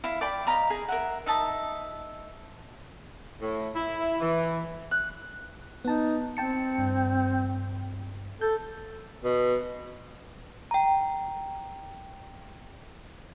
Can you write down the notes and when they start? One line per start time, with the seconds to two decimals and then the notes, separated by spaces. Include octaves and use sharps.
0.04 E4 F5
0.21 D5 G5 B5
0.47 D#5 F5 A#5 B5
0.70 G#4
0.88 A#4 E5 F#5
1.26 D#4 E5 A5 D#6
3.41 A2
3.74 E4
4.20 E3
4.91 F#6
5.85 B3 D#4 A5
6.37 C4 G5 A5 C#7
6.78 G2
8.41 A4 G6
9.24 B2
10.71 G5 A#5